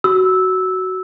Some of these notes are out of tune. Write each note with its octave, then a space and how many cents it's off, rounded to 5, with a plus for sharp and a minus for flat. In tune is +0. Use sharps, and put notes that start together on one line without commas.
F#4 +10 E6 -10